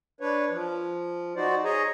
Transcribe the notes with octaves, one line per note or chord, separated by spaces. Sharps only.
D4 B4 C#5
F3
D#4 F#4 C5 D5
G#4 C#5 D#5 G#5 A#5